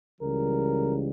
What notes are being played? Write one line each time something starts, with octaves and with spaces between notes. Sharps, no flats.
C#2 C#3 E3 G3 A#4